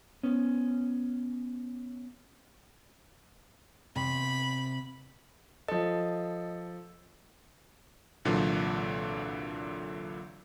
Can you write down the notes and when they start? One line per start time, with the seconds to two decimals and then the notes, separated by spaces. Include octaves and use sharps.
0.23 B3 C#4
3.96 C3 B5
5.68 F3 A4 D#5
8.25 C2 A#2 D3 E3 F#3